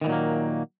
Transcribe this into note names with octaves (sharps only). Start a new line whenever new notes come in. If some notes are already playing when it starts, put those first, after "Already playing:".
A#2 D#3 E3 F#3 A#3